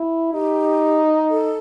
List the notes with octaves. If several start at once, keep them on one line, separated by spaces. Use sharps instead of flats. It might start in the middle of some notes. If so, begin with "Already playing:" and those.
Already playing: E4
D#4 G4
A4